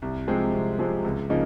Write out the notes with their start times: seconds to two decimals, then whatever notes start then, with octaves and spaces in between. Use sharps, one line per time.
0.02 C2
0.28 C3 F3 G#3 C4
0.53 C2
0.79 C3 F3 G#3 C4
1.04 C#2
1.30 C#3 F3 A#3 D#4